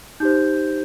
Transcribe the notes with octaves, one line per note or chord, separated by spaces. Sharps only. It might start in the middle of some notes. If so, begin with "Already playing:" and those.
D#4 G4 C5 G6